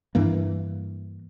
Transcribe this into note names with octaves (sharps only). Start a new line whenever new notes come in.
G2 E3 A#3